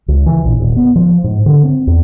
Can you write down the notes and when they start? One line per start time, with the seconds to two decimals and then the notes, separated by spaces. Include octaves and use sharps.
0.08 C#2
0.26 E3
0.44 A#1
0.60 D#1
0.76 B3
0.96 F3
1.24 G#2
1.46 D3
1.63 C4
1.87 E2